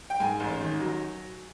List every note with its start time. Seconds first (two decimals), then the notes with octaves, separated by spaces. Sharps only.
0.10 G5
0.20 G#2 G#5
0.40 A1
0.61 D#3
0.80 F#3